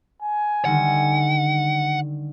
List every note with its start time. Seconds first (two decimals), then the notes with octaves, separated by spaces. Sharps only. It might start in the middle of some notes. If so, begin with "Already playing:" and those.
0.22 G#5
0.65 D3 D#3 G3 F#5